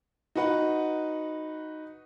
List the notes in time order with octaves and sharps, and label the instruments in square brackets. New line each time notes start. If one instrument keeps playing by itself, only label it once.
[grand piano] D#4 F#4 B4 F#5